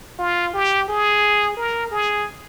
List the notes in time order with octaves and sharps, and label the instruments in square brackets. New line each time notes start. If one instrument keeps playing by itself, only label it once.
[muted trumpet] F4
G4
G#4
A#4
G#4